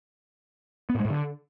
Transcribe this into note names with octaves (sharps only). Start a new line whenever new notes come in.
B3
A2
G#3
A2
D3